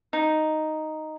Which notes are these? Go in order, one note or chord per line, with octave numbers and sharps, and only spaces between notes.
D#4